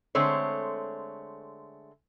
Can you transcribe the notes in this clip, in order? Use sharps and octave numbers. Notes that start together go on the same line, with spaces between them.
D3 G#3 A3 C4 C#5